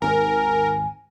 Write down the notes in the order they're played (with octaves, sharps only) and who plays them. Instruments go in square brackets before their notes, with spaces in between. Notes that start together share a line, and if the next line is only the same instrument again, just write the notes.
[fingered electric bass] G#1 D#2 G#2 [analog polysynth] A#4 [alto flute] G#5